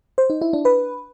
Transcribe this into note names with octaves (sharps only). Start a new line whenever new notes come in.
C5
D#4
E4
D4
B4